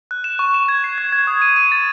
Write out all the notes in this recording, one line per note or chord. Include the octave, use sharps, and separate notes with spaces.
F#6
E7
C#6
E7
G#6
C7
G#6
G#6
D#6
D#7
D#7
A6